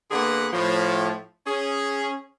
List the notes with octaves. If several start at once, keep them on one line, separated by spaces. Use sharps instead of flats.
D3 A#3 B3 G#4 B4 F#5
A2 F3
C#4 G#4